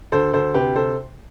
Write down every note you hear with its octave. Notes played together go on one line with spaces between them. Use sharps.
D2 A4 C5
D2 A4 C5
C3 G4 B4
C3 A4 C5